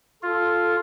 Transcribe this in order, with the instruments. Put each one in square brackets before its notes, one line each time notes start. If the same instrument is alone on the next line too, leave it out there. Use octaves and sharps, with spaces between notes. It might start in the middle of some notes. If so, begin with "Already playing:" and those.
[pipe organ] F4 [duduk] A4